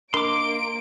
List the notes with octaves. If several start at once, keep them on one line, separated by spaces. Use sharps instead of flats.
A#3 D4 A#4 D#5 C6 D6 D7